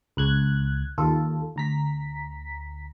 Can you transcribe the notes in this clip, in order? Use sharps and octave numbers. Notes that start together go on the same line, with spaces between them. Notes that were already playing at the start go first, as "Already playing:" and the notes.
C#2 F#6 G#6
D#2 F4 A4
D2 A#5 B6